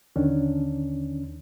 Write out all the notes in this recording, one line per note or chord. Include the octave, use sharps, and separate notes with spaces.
D#2 D3 D#3 C#4 D4